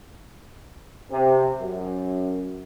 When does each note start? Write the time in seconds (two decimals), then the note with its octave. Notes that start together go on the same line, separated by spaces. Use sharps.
1.12 C3
1.61 F#2